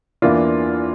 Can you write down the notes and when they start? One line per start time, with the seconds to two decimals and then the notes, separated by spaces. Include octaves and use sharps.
0.22 E2 E3 A#3 D4 F4